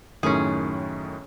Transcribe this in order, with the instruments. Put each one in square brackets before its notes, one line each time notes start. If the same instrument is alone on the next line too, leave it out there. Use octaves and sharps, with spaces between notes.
[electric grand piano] F#2 A2 D#3 [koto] C#4 G#4